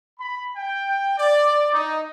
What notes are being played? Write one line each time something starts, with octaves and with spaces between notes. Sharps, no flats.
B5
G5
D5
D#4